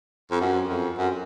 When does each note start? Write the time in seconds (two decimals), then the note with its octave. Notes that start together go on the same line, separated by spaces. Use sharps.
0.31 F2
0.40 F#2
0.69 F2
0.98 F#2